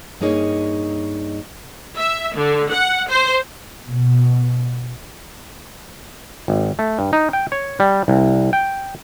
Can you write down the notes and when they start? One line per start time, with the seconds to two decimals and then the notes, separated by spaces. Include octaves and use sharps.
0.21 G2 A#3 D#4 G#4 C#5 D#5
1.98 E5
2.36 D3
2.72 F#5
3.09 C5
3.83 B2
6.48 G#1
6.79 A3
6.99 G2
7.13 D#4
7.33 G5
7.52 C#5
7.80 G3
8.08 C2
8.53 G5